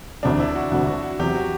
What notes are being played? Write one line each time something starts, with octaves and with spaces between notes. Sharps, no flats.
E1 D2 C3 D4
E4
F#4
E1 D2 C3 F#4
F#4
F#4
E2 C3 F#3 G4
F#4